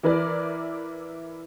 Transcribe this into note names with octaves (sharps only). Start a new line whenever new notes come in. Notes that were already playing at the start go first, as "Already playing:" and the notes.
E3 E4 A#4 B4 D5